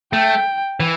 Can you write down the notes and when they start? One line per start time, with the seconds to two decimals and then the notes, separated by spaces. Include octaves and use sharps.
0.13 A3 G5
0.80 E3